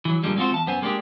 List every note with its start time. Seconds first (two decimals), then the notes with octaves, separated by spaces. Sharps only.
0.05 E3 F#3
0.23 G2 A#2 D3 F3 G3 G#3
0.37 G#3 C4 F4 F#4 C5
0.51 E2 A5
0.67 F#2 B3 C5 G#5
0.82 G#3 A#3 B3 D4 G4 G#4